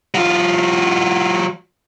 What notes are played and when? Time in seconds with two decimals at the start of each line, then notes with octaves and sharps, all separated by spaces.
0.14 F#3 F4